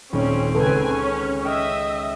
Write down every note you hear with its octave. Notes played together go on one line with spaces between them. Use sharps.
D#1 G#3 C4 C#4
C#2 C#4 A4 B4 G#5
C#4
D#5 E5 G5 C#6 F6